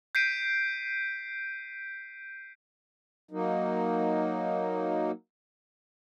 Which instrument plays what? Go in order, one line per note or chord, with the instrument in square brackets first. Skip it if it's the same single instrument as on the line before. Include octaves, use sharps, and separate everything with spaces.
[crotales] G6 B6 C7 D7 D#7
[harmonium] F#3 A#3 D#4